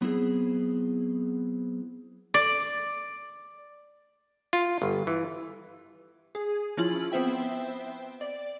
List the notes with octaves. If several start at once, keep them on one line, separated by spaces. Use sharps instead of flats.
F#3 B3 C4 E4 G#4
D5
F4
G1
E3
G#4
F3 C#4 E4 F4 F#7
B3 C4 C5 E5 G5
D5